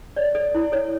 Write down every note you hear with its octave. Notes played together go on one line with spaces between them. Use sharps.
C#5 D5
A4 D5
E4
A4 C#5